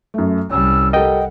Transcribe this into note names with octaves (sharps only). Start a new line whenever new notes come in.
F#2 A3
C2 G3 C#4 E6
G4 A4 A#4 D#5 F#5 G5